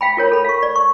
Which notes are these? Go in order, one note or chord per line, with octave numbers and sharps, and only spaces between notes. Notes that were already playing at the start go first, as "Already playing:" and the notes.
F5 G5 B5
F4 A#4 C#5
A4 B5
F5 C#6
D5
C#6